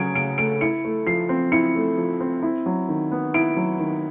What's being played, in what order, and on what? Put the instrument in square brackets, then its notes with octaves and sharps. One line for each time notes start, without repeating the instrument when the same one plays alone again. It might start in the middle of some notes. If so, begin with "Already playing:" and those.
Already playing: [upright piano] C#3 F#3 A3 C#4 G#6 D7
C#3 D7
A3 D7
E4 C#7
A3
F3 C7
C4
E4 C#7
A3
F3
C4
E4
F#3
D#3
B3
E4 D7
F#3
D#3